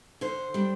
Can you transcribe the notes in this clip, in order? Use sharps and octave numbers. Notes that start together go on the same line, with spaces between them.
D3 C5
G3 D4